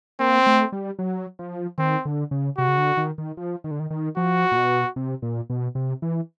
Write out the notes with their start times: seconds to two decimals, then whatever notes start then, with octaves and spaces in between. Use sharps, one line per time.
0.19 A#3 C4
0.47 A3
0.72 G3
0.99 F#3
1.39 F3
1.78 D#3 C4
2.05 D3
2.31 C#3
2.58 C3 F#4
2.68 C#3
2.78 D3
2.97 D#3
3.18 D#3
3.37 F3
3.64 D#3
3.71 D3
3.80 D#3
3.90 D#3
4.17 F3 F#4
4.52 A#2
4.57 B2
4.96 C3
5.22 A#2
5.50 B2
5.75 C3
6.02 E3